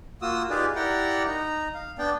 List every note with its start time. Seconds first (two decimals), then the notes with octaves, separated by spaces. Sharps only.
0.22 A#3 F4 F#4 D#6 E6
0.50 D#4 F4 G4 G#4 B4 D5
0.75 E4 G4 A#4 D5 F#5 G5
1.27 D#4 A#5
1.74 F5
1.99 B3 D4 D5 G5